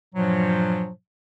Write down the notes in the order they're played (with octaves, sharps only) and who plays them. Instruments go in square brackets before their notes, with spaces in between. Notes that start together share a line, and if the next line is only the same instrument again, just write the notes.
[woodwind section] G2 A#2 F3 F#3